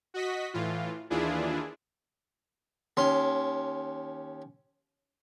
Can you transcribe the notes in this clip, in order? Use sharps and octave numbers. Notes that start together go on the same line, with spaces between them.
F#4 D#5 B6
A2 E3 F4
D#2 E3 D4 E4 F4 G#4
D#2 C#4 C6